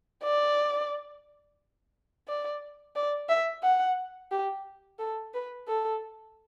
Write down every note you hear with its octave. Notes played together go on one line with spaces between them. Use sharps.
D5
D5
D5
E5
F#5
G4
A4
B4
A4